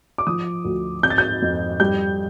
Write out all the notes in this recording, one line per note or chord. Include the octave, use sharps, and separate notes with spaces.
D6
F3 D#6
D2
C4 G6
A6
G6
F2
G3 G6